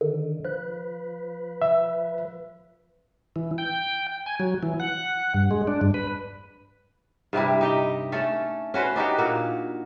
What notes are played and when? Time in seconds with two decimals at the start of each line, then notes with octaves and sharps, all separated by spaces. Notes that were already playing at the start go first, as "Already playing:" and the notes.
0.01 D3 D#3
0.45 F3 B4
1.62 E5
3.36 E3
3.58 G5
4.26 G#5
4.40 F#3
4.63 E3
4.80 F#5
5.34 G2
5.51 G#3
5.67 D4
5.81 G2
5.94 B4
7.33 G2 C3 G3 E4
7.61 D#4 G4 D#5
8.12 A3 C#4 A4
8.74 C#4 F#4 B4 C5
8.96 D4 D#4 F#4 G4
9.18 A#2 A#3 F#4